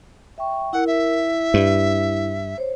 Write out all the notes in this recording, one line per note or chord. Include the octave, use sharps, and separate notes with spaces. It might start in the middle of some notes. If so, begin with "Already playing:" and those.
E5 G5 C#6
E4 A#4 F#5
E5
E4
G2
C5 C#5